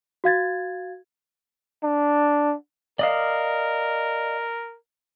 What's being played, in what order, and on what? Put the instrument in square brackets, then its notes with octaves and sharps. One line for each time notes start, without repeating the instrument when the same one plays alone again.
[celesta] F#4 F5 G#6 A6
[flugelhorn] D4
[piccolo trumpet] A#4 [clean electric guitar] D5 D#5 F5